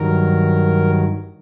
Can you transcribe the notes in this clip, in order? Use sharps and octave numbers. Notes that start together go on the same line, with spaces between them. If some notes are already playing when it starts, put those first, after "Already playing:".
Already playing: G2 D#3 F#3 A#4